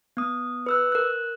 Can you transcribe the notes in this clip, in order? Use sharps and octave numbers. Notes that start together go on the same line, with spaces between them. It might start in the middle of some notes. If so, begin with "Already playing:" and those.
B3 D#6
B4 E6 F#6
A#4 F#6